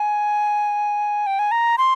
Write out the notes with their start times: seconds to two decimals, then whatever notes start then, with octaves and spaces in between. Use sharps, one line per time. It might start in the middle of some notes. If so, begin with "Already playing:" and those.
Already playing: G#5
1.27 G5
1.39 G#5
1.51 A#5
1.78 C6